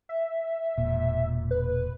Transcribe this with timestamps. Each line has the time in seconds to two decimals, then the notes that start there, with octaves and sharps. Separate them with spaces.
0.09 E5
0.78 E1 A#2
1.51 B4